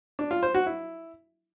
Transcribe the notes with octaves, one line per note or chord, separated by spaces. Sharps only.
D4
F4
C5
F#4
E4